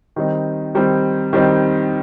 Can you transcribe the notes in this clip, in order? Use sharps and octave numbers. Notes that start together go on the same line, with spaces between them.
D#3 G3 C4 D#4
D#3 G3 C4 D#4
D#3 G3 C4 D#4